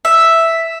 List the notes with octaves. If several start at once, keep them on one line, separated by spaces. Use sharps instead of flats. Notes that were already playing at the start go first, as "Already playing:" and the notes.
E5